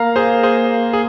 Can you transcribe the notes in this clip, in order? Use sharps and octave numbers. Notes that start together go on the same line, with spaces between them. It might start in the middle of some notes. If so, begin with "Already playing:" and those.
Already playing: A#3 F5 A#5
G#4 C5
G#4 C5
G#4